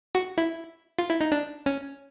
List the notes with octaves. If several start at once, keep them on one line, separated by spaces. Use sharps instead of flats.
F#4
E4
F4
E4
D#4
D4
C#4